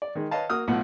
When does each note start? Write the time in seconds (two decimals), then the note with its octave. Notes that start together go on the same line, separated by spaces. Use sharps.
0.02 D5
0.15 D#3 G#3
0.31 B4 C#5 D#5 F5 A5
0.49 A#3 F#4 D#6 F6
0.68 B1 A2 B3 F4 F#5